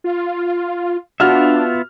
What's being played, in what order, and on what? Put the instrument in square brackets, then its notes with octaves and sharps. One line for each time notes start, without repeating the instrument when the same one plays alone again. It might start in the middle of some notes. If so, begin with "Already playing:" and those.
[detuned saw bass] F4
[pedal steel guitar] B3 F4 E5 [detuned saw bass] D4 [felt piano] F#4 F6